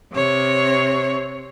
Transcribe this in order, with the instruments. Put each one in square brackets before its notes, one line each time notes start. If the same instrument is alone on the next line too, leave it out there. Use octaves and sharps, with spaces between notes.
[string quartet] C3 C#5